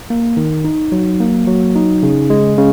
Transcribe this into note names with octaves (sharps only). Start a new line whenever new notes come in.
A#3
D#3
D#4
F#3
A#3
F#3
D#4
C#3
G#3
C#3